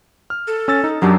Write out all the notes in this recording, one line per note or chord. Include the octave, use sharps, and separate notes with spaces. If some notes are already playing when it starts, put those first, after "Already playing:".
F6
A4
C#4 E6 A6
D#4
F#2 F#3 D4 G4